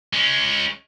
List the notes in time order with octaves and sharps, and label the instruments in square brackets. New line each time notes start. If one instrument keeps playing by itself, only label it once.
[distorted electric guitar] G#3 C#4